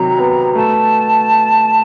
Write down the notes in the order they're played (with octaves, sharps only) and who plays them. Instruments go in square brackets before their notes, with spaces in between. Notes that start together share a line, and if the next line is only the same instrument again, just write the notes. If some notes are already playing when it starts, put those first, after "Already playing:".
Already playing: [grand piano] C3 D#3 F#3 [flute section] A#5
[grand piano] B3
[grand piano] A3 [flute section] A5